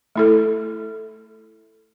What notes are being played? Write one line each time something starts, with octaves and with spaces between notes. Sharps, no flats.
A3 E4 A4